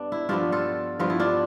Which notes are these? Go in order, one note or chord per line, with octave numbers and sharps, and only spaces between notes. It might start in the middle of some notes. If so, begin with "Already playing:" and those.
Already playing: G2 B3 D4
E4
G2 F3 B3 D4 F4
F4 A4
G2 F3 B3 F4
E4
D4 F4